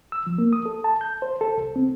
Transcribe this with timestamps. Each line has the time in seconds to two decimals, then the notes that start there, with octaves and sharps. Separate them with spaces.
0.12 E6
0.27 F3
0.38 A#3
0.53 D#6
0.66 A4
0.84 A5
1.01 G6
1.22 C5
1.41 A4
1.58 C2
1.76 C4